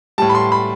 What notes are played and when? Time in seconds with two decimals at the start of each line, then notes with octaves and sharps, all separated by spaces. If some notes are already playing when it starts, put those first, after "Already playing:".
0.18 A2 G3 A5
0.30 B5
0.35 C6
0.52 B5